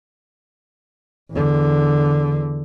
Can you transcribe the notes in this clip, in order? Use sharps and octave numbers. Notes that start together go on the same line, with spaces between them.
E2 D3